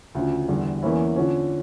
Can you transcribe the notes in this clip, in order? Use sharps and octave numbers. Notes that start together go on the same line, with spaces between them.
D2 C#3 F3
E2 D3 G3
E2 E3 A#3 C#4 E4
D3 F3 C#4